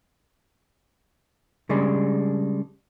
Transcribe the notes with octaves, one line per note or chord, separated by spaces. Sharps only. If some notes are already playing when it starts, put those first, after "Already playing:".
C#3 G3 G#3 D4